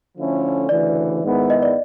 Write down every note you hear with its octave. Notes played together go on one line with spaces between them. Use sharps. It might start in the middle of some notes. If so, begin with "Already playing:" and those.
D3 F3 A3 C#4 E4
D2 C#3 E3 D5
G#2 D#3 G#3 B3 E4
D#5
D5